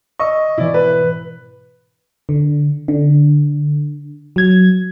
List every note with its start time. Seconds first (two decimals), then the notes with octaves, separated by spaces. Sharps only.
0.19 D#5 C#6 E6
0.58 G#2 B2 E3 E4 D5
0.74 B4
2.29 D3
2.88 D3
4.36 F#3 G#6